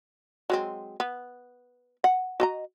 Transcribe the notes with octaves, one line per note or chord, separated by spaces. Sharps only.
F#3 G#3 C4
B3
F#5
F#4 D#5 A#5